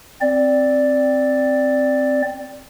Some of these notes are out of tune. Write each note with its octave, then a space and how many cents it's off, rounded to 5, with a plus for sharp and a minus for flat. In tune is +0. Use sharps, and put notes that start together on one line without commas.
C4 +0 D5 +0